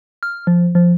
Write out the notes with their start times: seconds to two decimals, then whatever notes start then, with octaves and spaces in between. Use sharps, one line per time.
0.23 F6
0.47 F3
0.75 F3